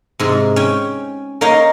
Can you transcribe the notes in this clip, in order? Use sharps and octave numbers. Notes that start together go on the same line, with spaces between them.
G#2 C3
C#4 G5
A#3 D#4 A#4 C#5 D#5 F5